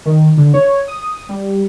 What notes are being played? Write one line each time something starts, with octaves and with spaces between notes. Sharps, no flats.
D#3
D3
C#5
D#6
G3